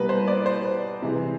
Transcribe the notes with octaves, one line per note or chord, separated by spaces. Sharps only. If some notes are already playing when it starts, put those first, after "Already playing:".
Already playing: B2 G3 A#3 B4
C5
D5
C5
C3 E3 G#3